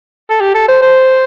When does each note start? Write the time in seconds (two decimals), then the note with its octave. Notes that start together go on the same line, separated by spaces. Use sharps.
0.30 A4
0.41 G4
0.55 A4
0.68 C5
0.82 C5